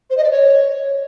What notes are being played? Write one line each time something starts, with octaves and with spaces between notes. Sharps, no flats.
C5
D#5
D5
C#5